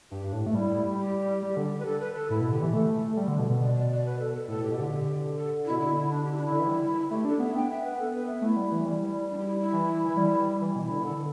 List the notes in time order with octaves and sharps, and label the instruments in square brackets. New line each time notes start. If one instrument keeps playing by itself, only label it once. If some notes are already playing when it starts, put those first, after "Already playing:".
[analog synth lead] G2 [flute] G4
[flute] D4
[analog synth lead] A2
A3
[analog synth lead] G3 [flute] E4
[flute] G4
[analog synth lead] G3
D3
[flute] B4
A4
B4
A4
[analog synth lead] A2 [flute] E4
[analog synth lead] B2
[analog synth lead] D3 [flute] G4
[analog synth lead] E3
[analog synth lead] A3 [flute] A4
[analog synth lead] G3
D3
B2
B2
[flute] D5
D5
D5
B4
A4
A4
[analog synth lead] A2 [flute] A4
[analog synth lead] A2 [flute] G4
[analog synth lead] B2
[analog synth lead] D3 [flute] G4
[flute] A4
E4
[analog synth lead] B2
[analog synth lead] D3 [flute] E4
[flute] E4
D4
G4
E4
D4
E4
[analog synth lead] D3
E3
G3
[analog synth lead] A3 [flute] G4
[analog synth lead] D4 [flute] A4
[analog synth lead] B3 [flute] E5
[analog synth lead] B3 [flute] G5
[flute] E5
B4
A4
B4
E5
[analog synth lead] A3 [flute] E4
[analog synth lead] G3
E3
G3
[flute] D4
G4
E4
E4
[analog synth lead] E3
E3
G3
E3
B2
[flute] E4
[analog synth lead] D3
E3
[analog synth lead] D3 [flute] A4